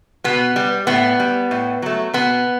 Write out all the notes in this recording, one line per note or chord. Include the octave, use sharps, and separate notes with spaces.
B2 B3
G3
A2 B3
G3
A2
F#3 A3
B2 B3